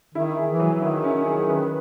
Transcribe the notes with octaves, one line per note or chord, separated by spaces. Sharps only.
D#3 E4
G#4
E3
F#3
D#3 E4
C#4
G#4
B4